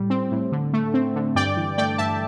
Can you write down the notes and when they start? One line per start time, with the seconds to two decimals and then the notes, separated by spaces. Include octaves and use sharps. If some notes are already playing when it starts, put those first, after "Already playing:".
Already playing: A2 G3
0.10 C4
0.32 A2
0.52 D3
0.73 A3
0.94 C4
1.15 D3
1.35 G2 D5 G5
1.57 E3
1.78 A3 D5 G5
1.98 G2 E5 A5